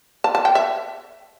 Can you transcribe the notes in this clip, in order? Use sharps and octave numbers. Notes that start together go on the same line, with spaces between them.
A5
A5
G5
E5